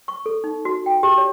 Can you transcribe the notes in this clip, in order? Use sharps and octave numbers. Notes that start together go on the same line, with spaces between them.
C#6
A4
D#4
F#4
G5
G4
C#5